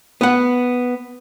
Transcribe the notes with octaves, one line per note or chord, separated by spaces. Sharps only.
B3 F#5